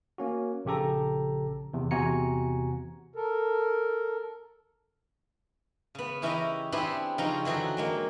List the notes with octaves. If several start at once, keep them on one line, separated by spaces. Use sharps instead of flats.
A#3 C#4 F#4
A#1 C#3 G4 A4 A#5
E2 C3
E2 C3 F#4 G#5 A#5 C#7
A4 A#4
C#3 B3
E3 C#4 E4 G4 D#5 A#5
B3 C4 D4 E4 G4 G#4
C#3 F3 C4 D#4 C#5 A#5
D3 E3 F#3 F#4 G#4
F#3 G#3 A#3